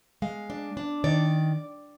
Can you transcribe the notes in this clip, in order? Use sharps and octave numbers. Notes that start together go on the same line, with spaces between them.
G#3 F5
D4
D4
D#3 D5